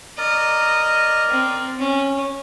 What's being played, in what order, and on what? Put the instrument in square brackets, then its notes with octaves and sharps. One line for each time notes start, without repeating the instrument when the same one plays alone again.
[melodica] A#4 D5 A#5 [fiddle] D#5
[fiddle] C4
C#4